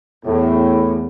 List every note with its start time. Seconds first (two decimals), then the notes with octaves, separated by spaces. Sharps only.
0.25 E2 A2